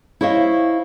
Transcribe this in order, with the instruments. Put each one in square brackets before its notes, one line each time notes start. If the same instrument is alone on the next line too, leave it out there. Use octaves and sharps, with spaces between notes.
[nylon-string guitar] E4 C5 C#5 D#5 F5